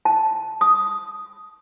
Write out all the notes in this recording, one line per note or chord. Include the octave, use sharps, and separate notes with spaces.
A5
D#6